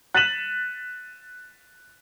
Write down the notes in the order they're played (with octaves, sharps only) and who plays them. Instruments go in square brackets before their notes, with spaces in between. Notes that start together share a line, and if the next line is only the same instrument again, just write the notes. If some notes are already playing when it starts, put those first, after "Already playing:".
[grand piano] F#6 A6 B6 D#7 E7 F#7